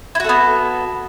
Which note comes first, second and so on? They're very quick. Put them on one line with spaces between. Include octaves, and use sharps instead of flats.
E4 F#4 A4 B3